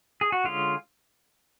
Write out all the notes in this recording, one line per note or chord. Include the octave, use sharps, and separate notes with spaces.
G#4
F#4
D3 G#3 C#4 F4